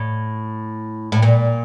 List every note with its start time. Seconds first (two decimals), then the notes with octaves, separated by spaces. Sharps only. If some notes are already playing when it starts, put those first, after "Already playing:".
Already playing: A2
1.12 A2
1.22 A#2